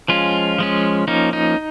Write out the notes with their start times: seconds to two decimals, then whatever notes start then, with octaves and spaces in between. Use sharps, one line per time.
0.08 F3 G#3 C#4 F4
0.58 F3 G#3 C#4
1.08 F3 A#3 C#4 D#4
1.33 D#4